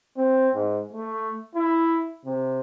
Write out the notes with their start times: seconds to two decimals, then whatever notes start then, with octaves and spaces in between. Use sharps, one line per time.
0.17 C4
0.55 G#2
0.93 A3
1.55 E4
2.25 C3